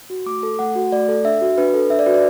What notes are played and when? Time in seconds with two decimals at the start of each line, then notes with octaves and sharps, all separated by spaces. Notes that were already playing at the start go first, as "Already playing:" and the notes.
0.10 F#4
0.26 A3 D6
0.43 A4
0.59 A3 F#5
0.75 F#4
0.92 A3 D5
1.08 A4
1.25 D4 E5
1.41 F#4
1.58 D4 B4
1.74 A4
1.90 D4 E5
1.99 D5
2.06 F#4 B4
2.14 D5